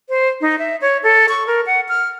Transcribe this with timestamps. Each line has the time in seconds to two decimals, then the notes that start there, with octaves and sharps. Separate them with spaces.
0.09 C5
0.41 D#4
0.59 E5
0.81 C#5
1.03 A4
1.29 C#6
1.47 A#4
1.66 F#5
1.88 F6